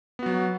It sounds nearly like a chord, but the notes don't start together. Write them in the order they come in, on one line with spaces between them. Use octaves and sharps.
B3 F#4 F#3